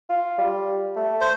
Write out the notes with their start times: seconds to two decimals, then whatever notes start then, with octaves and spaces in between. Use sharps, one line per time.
0.09 F4
0.38 G3
0.96 A3
1.21 C5